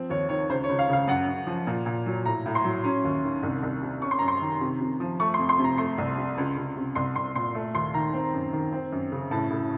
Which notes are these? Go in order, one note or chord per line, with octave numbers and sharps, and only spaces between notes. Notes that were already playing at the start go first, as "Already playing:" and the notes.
Already playing: F3 C4
D#2 C#5
D#3 C#5
C#2 C5
C#5
C#2
F5
C#3 F5
F#2 F#5
F#2
F3
A#2
A#2
F#3
A2 A#5
A2
C6
F#3
C#4
D#2
D#3
C2
C2
C3
C#4 C#6
C6
F#2 A#5
C6
D#3
C3
C3
F3
A3 C#6
C6
F2
C6
C3
A#5
A3 C6
C2
C3
C#2
C#2
C3
C2 C6
C2 C6
A#2 C6
A3
D#2 C6
D#3 A#5
C4
F#2
D#3
C4
F#2
C#3
A2 A5
A2